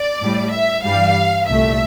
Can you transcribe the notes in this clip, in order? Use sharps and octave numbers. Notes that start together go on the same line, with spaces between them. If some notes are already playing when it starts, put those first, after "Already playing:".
Already playing: D5
A2 G3
E5
G2 E3 G3 F5
C2 A#2 A3 E5